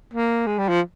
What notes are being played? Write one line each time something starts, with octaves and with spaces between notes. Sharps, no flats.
A#3
G#3
G3
F3